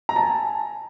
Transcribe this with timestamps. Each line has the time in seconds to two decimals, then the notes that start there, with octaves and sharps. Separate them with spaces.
0.09 A#5
0.16 A5
0.23 G#5